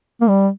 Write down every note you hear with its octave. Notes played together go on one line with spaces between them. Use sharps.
A#3
G3